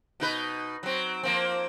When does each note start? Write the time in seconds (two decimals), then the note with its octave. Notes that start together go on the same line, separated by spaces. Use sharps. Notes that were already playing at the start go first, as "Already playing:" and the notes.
0.20 B2 D#4 B4
0.83 F#3 C4
1.23 F3 A#3 C4